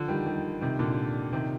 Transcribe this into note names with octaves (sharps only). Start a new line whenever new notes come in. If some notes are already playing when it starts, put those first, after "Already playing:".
Already playing: D3 F3
D#3 G3
D#3 G3
C3 D#3
A#2 D3
C3 D#3